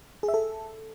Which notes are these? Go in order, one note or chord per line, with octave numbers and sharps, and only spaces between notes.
G#4
E5
A4